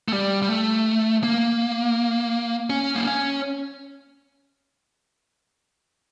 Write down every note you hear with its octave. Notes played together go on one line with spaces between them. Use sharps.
A3
G3
G3
A3
A#3
C#4
A#3
C#4